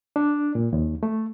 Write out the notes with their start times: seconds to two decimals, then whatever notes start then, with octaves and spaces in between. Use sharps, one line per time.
0.16 D4
0.55 A#2
0.73 D#2
1.03 A3